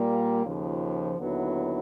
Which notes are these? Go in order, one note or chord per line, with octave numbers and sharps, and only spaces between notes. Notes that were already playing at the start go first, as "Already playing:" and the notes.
Already playing: A#2 G3 A#3
D#2 C#3 F3
D#2 D3 F#3 B3 E4